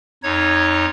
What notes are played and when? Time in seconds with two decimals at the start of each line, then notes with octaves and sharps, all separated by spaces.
0.23 F2 D#4 C#5 G#6